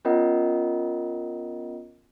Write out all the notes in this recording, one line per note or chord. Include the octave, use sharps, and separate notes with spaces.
B3 C#4 F4 A#4 D#5 F#5